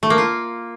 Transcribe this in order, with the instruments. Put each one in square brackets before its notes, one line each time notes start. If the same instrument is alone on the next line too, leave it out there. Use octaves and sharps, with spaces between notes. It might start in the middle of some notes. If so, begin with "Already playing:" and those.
[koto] A3
A#3
F4